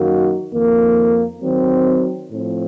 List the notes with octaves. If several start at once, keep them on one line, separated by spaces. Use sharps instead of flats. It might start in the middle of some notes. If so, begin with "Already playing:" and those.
Already playing: F#2 D#3 A#3 D#4 F#4
F2 D#3 A#3
D#3 F#3 C4
A2 F3 C4